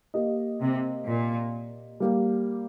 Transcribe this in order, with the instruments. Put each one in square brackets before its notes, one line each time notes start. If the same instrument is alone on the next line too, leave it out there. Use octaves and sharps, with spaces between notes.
[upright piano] A#3 G4 D#5
[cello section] C3
A#2
[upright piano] G3 A#3 G4